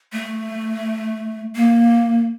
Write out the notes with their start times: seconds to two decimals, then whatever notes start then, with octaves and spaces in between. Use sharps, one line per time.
0.13 A3
1.55 A#3